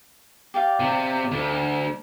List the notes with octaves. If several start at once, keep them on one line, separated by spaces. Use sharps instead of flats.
G4 D5 F5
C3 C4
D2